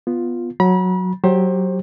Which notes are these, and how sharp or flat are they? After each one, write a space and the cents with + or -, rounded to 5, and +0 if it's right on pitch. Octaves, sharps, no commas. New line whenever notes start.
B3 +0 F4 +0
F#3 -10 B5 -40
F#3 +15 G4 +0 C5 +30